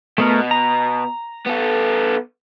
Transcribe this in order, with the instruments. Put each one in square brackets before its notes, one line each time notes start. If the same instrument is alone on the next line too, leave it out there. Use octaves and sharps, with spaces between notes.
[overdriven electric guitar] B2 [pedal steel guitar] A3 B3 A#4
[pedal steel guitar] A#5
[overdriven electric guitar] B3 A4